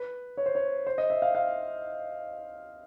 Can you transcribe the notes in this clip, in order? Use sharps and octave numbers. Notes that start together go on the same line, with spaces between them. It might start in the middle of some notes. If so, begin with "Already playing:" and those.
Already playing: B4
C#5
C5
C#5
C5
D#5
E5
F5
F5